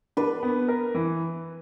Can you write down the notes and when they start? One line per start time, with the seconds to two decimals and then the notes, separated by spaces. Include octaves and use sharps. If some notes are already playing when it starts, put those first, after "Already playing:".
0.17 D4 B4
0.43 B3
0.68 A#4
0.95 E3